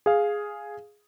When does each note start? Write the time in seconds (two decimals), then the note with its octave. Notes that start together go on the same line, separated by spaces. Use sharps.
0.06 G#4 F5